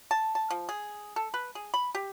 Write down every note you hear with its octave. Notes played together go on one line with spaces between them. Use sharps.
A5
A5
F3
G#4
A4
B4
G#4
B5
G4